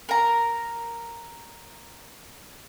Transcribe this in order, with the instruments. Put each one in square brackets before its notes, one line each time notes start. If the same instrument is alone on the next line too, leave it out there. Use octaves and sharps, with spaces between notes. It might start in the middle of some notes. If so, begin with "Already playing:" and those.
[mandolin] A#4 A#5